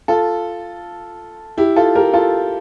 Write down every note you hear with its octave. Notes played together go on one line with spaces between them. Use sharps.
F4 A4
E4 G4
F4 A4
G4 A#4
F4 A4